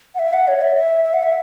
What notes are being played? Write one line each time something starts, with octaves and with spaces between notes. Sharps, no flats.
F#5
E5
F#5
C#5
E5
E5
E5
F#5
E5